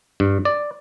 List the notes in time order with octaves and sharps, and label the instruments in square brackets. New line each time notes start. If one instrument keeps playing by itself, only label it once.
[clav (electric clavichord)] G2
D5